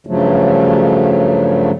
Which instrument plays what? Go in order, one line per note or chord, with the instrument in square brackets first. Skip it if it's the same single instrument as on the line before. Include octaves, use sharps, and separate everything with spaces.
[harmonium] G2 C#3 F3 F#3 A3